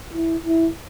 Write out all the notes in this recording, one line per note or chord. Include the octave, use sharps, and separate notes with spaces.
E4
E4